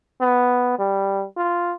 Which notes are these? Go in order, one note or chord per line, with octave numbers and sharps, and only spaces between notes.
B3
G3
F4